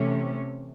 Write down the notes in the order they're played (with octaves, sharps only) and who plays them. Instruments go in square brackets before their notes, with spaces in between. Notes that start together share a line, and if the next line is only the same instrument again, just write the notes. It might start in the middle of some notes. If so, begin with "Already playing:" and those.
Already playing: [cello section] C3 E3 A3 C#4